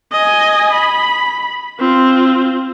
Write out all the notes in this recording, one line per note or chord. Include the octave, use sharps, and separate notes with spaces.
D#5 G#5
B5
C4 F4